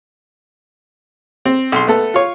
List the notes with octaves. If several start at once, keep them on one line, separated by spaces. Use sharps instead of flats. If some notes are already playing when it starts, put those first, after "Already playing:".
C4
B1 C6
A3 B3 A4
F4 C#5